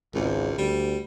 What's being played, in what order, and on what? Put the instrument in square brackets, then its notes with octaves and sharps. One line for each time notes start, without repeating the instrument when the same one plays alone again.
[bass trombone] G#1 [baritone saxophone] C#2
[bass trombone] D2 [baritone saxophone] G3